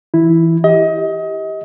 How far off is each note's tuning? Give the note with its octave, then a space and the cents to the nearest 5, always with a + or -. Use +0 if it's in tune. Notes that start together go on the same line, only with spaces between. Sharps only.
E3 +0 E4 +0
G4 +10 D#5 +30